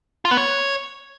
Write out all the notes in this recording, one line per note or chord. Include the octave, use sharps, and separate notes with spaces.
F4
B3
C#5